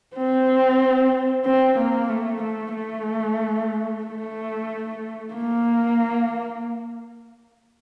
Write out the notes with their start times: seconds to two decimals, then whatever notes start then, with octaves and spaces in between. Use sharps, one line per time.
0.16 C4
1.45 C4
1.78 A#3
2.10 A3
2.42 A3
2.75 A3
4.04 A3
5.33 A#3